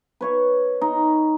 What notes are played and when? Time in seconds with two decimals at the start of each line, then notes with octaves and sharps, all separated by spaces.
0.21 B4 C#5 C#6
0.81 D#4